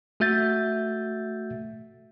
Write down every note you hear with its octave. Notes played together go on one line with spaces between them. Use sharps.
A3 F#4 E5 G6 A6